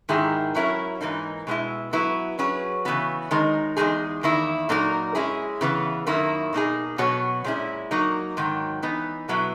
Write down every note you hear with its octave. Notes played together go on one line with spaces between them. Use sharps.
G#2 D#3 A#3 E4 G#4
F#3 C#4 E4 A#4
G#2 E3 A#3 D#4
B2 G#3 B3 E4
F#3 B3 E4 B4
F#3 C#4 G#4 B4
C#3 E3 B3 F#4
D#3 G#3 D#4 A#4
E2 C#3 G#3 D#4 G#4
E2 D#3 A#3 E4
A#2 F#3 A#3 D#4 A#4
G#3 C#4 E4 G#4
C#3 E3 B3
F#2 D#3 A#3 E4
B2 A#3 D#4 G#4
B2 F#3 B3 F#4 C#5
A#2 G#3 C#4 E4
F#3 A#3 D#4 A#4
G#2 D#3 F#3
E3 B3 D#4
B2 F#3 B3 E4